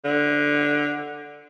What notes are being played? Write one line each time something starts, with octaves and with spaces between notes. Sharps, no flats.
D3